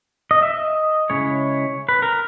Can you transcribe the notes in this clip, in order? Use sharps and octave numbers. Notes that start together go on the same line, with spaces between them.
D#5
E5
D#5
C#3 G#3 C#4 E4 C#5
B4
A#4